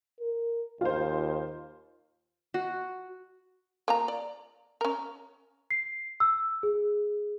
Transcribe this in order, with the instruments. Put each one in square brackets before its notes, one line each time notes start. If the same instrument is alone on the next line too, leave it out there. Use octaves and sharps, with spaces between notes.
[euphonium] A#4
[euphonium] D#2 [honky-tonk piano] F4 C5
[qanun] F#4
[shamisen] A#3 F4 A#5
D5
C#4 A#4
[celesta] C7
E6
G#4